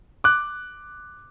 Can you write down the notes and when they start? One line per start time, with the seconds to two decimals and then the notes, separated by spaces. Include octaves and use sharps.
0.24 D6 F#6